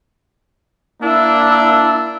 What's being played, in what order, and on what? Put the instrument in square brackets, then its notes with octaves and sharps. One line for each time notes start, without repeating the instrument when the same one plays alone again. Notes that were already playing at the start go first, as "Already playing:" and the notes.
[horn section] A#3 D4 [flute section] E4 E6